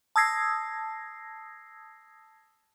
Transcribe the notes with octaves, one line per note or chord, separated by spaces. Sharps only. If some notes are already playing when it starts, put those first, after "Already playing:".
A5 D#6 E6 G#6 A#6 C7